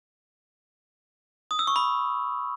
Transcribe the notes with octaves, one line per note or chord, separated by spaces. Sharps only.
D#6
E6
C#6
B5